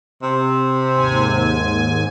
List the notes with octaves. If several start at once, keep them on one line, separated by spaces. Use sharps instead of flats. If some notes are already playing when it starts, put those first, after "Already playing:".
C3
D#2 G#2 G#5